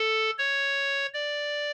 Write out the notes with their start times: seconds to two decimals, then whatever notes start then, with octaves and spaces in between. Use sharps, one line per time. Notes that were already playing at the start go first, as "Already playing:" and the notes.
Already playing: A4
0.38 C#5
1.14 D5